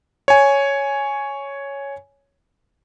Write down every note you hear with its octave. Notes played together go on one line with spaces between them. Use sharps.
C#5 G#5